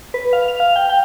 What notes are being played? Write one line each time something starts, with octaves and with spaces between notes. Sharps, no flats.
B4
F5
F7
F5
G5
G5